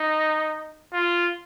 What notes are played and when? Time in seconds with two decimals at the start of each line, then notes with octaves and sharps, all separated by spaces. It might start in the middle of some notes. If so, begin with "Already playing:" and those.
Already playing: D#4
0.93 F4